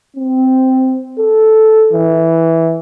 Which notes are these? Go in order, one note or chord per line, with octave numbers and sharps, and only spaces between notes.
C4
A4
E3